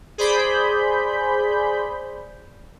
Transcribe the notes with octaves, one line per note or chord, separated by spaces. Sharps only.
G#4 C5 D5 B5 G6